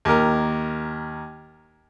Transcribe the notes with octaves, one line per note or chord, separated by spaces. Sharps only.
D#2 A#4